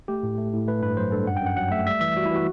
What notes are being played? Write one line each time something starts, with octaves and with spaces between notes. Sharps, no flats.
A3 G4
A2
A3
A2
A3 B4
G2 B4
F#3 C5
G2 A4
F#2 F#5
G5
F#2
F#5
F#3 F#5
A3 E5
G3 E5
E3 E5
G3 F#4
E4
E3 F#4